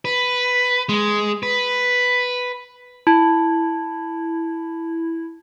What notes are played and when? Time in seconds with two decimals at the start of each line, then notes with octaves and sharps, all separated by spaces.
0.05 B4
0.89 G#3
1.43 B4
3.07 E4 A5